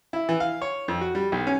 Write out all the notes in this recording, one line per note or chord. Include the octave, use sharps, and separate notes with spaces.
E4
E3
F5
C#5
F2
F#4
G3
B1
C#4